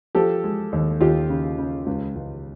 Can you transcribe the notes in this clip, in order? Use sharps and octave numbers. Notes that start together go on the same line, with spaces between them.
F3 G4 A4
G#3
D#2
D#2 F4 G4
C#3
C#3
C#2
C#2